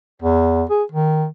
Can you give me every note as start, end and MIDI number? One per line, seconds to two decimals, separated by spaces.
0.22 0.64 40
0.69 0.83 68
0.92 1.26 51